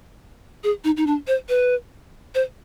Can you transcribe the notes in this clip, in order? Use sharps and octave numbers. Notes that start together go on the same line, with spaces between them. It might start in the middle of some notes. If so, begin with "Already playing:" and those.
G#4
D#4
D#4
D4
C5
B4
C5